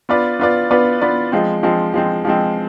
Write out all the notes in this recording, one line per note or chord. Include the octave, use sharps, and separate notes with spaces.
B3 F4 B4 D5
B3 F4 B4 D5
B3 F4 B4 D5
B3 F4 B4 D5
F3 G#3 C4
F3 G#3 C4
F3 G#3 C4
F3 G#3 C4